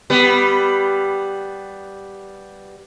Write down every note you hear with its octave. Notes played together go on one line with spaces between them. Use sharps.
G3 B3